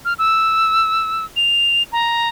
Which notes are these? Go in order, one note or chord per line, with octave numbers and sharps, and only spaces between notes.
F6
E6
F7
A#5